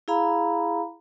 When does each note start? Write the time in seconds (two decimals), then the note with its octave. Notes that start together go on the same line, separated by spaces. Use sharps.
0.08 E4 G#4 F5 A#5 B5